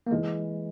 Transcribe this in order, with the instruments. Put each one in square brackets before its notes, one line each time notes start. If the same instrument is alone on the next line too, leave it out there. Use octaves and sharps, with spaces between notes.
[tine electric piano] A#3
[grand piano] E3 [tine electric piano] G#3